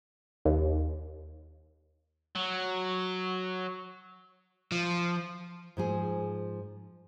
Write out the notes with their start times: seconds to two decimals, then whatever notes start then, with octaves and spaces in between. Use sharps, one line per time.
0.45 D#2
2.36 F#3
4.72 F3
5.77 G#2 F3 G#4